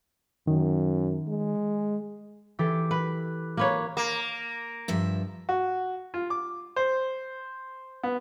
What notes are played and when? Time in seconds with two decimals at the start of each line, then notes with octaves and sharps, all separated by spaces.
0.47 F#2 D#3
1.28 G#3
2.59 E3 G4 A4
2.91 B4
3.57 A#3 B4 C#5
3.97 A#3
4.88 G2 F3 E5
5.49 F#4
6.14 F4
6.30 D6
6.76 C5
8.03 B3